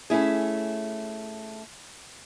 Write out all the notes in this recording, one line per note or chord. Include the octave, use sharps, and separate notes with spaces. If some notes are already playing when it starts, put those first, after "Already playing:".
A3 C#4 E4 G#4